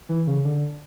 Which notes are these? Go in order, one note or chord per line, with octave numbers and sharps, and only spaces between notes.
E3
C#3
D3